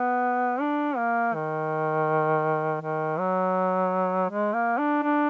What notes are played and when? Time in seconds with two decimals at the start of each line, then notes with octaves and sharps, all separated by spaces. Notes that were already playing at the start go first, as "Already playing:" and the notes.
Already playing: B3
0.60 D4
0.97 A#3
1.35 D#3
2.81 D#3
3.19 F#3
4.29 G#3
4.54 A#3
4.78 D4
5.03 D4